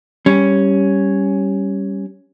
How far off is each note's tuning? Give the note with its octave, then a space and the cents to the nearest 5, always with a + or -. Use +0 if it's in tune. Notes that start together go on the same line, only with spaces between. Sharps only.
G3 +0 C#4 +0